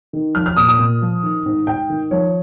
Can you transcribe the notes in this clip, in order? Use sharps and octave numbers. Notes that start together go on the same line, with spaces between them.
D#3
F3 F6
F6
A#2 D#6
D#6
A#2
F3
D#3
G#2
G#2 G5
D#3
F3 C#5